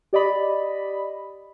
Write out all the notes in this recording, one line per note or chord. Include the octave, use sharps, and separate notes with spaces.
G4 D5 D#5 B5